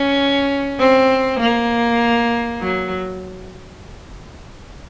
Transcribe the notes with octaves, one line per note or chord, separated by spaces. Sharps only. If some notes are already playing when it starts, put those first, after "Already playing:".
Already playing: C#4
C4
A#3
F#3